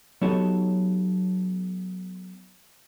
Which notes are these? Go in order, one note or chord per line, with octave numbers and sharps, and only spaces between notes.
F#3 B3 D#4 G4 A4 C#5